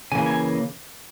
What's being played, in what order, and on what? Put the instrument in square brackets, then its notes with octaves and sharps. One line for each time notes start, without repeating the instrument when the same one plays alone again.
[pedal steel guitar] C#3 E3 A#3 G#5
G#5